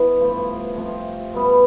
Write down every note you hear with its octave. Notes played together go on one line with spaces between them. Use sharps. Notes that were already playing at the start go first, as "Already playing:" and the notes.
Already playing: E3 B3
G2 F3 A3 E4
C3 F3 A3
B2 G3 B3